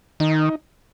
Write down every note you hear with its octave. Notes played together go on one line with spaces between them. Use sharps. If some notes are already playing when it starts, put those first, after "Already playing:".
D#3 D#4